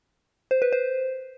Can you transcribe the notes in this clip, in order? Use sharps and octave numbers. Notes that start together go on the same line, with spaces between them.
C5
B4
C5